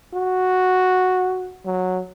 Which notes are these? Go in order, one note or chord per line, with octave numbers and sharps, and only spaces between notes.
F#4
F#3